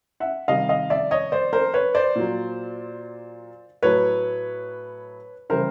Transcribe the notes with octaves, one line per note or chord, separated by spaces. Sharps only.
E5 F#5
C3 D#3 G3 D#5 F5
D#5 F5
D5 E5
C#5 D#5
C5 D5
A#4 C5
B4 C#5
C5 D5
A#2 F#3
A2 F#3 B4 C#5
C#3 E3 G3 A#4 C5